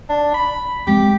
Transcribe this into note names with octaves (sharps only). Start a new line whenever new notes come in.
D4
B5
G#3 C4 G4